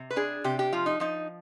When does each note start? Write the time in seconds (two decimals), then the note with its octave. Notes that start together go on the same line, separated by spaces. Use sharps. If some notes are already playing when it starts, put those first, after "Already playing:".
Already playing: C3
0.11 B4
0.16 D4 G#4
0.44 C3 G4
0.59 G4
0.72 F3 F4
0.86 D#4
1.00 F3 D#4